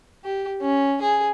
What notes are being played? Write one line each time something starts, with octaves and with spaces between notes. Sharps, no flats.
G4
C#4
G#4